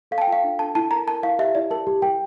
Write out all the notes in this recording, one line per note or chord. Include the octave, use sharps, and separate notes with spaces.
A4 F5
A5
G5
F4
F5
D4
A4 A5
E4 A5
A#4 A#5
A#4 A5
E4 F5
G4 E5
E4 D5
A#4 A5
G4
A#4 G5